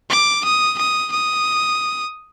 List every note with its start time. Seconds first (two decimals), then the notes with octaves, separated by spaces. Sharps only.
0.10 D6
0.44 D#6
0.78 D#6
1.12 D#6